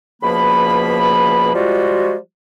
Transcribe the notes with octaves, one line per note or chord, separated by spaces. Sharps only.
C#2 B2 F3 A#3 B5
F3 G3 G#3 F4 F#4